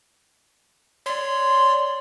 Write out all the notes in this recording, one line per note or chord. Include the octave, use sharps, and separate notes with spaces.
C#5 D5 C6